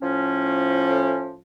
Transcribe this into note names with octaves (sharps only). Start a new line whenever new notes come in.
A2 F3 C#4